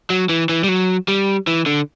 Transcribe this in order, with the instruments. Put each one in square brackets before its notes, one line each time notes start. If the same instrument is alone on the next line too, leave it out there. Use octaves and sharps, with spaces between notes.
[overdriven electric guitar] F#3
E3
E3
G3
F#3
G3
E3
D3